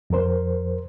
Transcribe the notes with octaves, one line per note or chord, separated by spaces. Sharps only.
F2 F3 A#4 C5